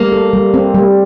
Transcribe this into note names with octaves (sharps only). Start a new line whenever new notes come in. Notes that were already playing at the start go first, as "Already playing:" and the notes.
Already playing: G3 A#3
A4
G3
C4
G3